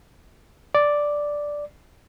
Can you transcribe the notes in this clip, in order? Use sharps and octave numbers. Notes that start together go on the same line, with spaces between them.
D5